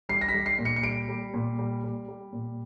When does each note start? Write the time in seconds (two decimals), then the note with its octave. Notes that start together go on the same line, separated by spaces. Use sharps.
0.09 G3 C7
0.21 A#6
0.28 B6
0.34 G3
0.46 C7
0.58 A#2
0.65 C#7
0.76 C#7
0.83 G3 D7
1.09 G3
1.34 A#2
1.59 G3
1.83 G3
2.08 G3
2.33 A#2